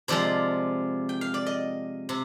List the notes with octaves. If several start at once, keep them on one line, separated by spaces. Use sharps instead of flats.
C3 F3 G#3 D5
G5
F5
D5
D#5
C3